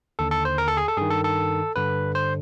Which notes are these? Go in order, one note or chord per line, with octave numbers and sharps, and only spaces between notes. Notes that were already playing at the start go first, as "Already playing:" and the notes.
D#2 D3 A4
A4
C5
A#4
A4
G#4
A4
G2 D#3 G#4
A4
A4
G2 D3 B4
C5